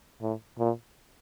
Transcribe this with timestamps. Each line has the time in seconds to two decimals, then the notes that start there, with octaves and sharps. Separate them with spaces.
0.22 A2
0.59 A#2